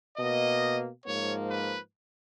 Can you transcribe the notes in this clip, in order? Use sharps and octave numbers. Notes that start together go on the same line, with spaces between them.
B2 A#3 D#5
G#2 F3 A#3 C#5
B4